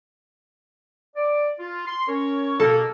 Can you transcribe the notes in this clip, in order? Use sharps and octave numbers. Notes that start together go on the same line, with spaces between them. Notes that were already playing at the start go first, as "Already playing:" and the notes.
D5
F4
C6
C#4 A#4 C#5
B2 A#3 A4